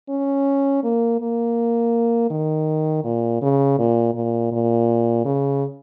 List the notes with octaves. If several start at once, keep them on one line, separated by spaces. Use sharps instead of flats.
C#4
A#3
A#3
D#3
A#2
C#3
A#2
A#2
A#2
C#3